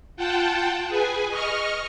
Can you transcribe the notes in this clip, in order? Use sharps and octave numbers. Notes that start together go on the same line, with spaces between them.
F4 F#5 G5 A5
G#4 B4 G#5
D#5 C#6 F6